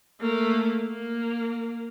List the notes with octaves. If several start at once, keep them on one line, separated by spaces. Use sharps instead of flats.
A3 A#3
A#3